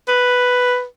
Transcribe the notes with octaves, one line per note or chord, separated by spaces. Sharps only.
B4